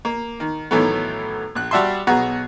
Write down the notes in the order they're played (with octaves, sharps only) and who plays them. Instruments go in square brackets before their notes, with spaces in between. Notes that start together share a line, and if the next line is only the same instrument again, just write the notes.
[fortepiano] A#3
D#3
A2 D#3 E3 F#3 A3 B3
A#1 F#6
G3 F#4 D5 E5 A5 C6
B1 B3 F#4 G#4 A#5